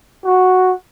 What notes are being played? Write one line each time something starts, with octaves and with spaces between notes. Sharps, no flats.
F#4